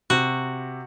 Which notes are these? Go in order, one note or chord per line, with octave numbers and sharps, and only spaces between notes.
C3 F#4